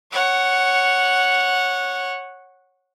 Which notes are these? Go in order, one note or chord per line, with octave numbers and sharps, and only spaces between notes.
C#5 F#5